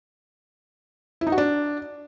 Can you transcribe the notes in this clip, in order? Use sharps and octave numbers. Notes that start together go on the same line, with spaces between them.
E4
D#4
F#4
D4